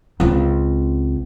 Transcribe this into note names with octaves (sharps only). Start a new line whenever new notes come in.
C#2 C4